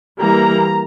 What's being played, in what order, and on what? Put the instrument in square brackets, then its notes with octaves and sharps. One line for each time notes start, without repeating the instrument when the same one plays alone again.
[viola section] E3 G3 A#3 A#5